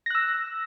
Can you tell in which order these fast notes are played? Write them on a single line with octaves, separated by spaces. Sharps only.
A#6 F#6 E6